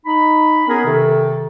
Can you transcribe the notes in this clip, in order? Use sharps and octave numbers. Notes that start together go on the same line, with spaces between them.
D#4 B5
B3 C#4 D#4 G#4 A#4
C3 D#3 A4